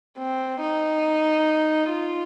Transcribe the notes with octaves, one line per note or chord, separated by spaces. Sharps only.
C4
D#4
F4